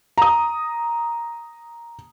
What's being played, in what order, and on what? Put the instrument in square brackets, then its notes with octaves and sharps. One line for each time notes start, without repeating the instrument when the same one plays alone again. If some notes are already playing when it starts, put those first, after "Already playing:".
[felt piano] A#5 D#6